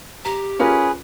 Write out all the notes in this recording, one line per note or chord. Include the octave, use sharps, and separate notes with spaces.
G4 A#5
C#4 F4 G#4 A#4 B4